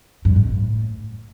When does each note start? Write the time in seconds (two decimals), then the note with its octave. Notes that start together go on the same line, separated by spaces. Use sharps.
0.25 G2
0.36 G#2
0.47 A2